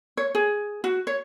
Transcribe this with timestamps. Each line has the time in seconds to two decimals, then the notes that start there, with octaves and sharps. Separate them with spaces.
0.17 C#5
0.35 G#4
0.84 F#4
1.07 C#5